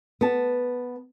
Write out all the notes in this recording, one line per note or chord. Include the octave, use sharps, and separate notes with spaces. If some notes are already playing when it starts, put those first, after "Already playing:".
B3 A5